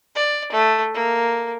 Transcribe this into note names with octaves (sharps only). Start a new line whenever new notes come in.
D5
A3
A#3